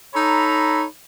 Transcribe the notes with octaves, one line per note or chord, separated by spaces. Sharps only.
D#4 A4 C#5 A#5 B5